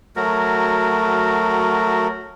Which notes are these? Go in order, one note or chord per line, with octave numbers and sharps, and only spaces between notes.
F#3 A3 F#4 A#4